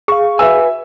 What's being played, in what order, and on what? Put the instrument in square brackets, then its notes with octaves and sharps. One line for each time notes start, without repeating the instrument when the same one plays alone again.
[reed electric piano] G#4 F5 [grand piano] C#6
[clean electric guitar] F#4 B4 G#5 [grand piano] E5 E6